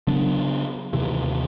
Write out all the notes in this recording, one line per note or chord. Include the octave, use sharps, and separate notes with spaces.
C#3 F#3 B3 D4
D#2 C3 E3